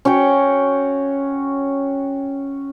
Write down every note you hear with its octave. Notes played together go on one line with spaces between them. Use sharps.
C#4 F#4 C#5 G5